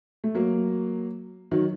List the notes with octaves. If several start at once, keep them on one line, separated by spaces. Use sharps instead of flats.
A3
F#3 A#3
D#3 F#3